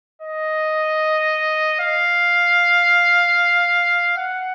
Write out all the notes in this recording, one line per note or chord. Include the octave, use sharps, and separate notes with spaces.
D#5
F5
F#5